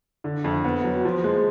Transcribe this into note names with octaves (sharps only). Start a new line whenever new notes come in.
D3
F2
B3
F#3
F3
G#3